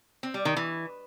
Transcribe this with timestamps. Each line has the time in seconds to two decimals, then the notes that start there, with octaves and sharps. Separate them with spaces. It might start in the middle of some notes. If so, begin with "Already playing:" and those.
0.23 C4
0.34 G3
0.45 D#3
0.57 E3